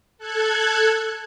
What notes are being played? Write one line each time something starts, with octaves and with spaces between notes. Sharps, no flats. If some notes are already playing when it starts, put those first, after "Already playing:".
A4 F#6 G#6